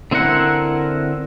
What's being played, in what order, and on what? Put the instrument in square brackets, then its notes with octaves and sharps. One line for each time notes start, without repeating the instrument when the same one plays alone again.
[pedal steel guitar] D3 C4 E4 A#4 F#5